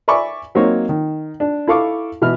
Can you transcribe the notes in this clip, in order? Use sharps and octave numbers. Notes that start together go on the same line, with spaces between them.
D5 E5 G#5 B5 C#6 D6
F#3 A#3 C4 D#4 C#5
D#3
D4
E4 A4 F5 C#6 D6
B2 E3 E5 F6